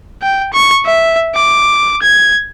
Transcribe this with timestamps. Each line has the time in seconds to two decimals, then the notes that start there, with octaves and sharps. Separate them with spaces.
0.22 G5
0.53 C#6
0.86 E5
1.35 D6
2.03 G#6